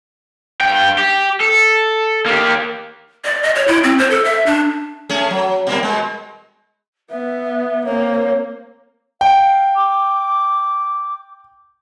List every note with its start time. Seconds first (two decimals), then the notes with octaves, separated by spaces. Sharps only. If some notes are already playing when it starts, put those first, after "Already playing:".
0.61 G2 G5
0.98 G4
1.40 A4
2.26 A#3 G4
3.24 D5
3.43 D#5
3.56 C#5
3.68 E4
3.84 C4
3.98 C5
4.11 A4
4.25 E5
4.46 D4
5.09 A3 C#4 G#4
5.31 F#3
5.67 B2 G3 A#3
5.83 B2 G#3
7.10 B3 E5
7.85 A#3 C4 C#5
9.21 F5 G5
9.76 D6